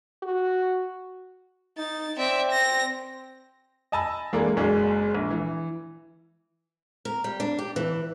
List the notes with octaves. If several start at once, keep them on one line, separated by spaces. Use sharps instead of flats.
F#4
D#4 A6
C4 D5 E5
A#6
D#5 G#5 A5 B5 E6
E3 G#3 A#3 D4 A4 A#4
F#1 B1 G#3 D4
A#1
E3
A#4
G3
D4
G4
E3